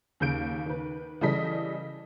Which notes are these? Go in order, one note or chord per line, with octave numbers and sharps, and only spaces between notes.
D#2 C#3 G6 D7
D#3 B4
C#3 E3 G3 A4 D#5 B6